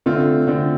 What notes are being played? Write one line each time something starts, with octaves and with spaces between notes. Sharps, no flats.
D3 A3 C4 F4
D3 A3 C4 F4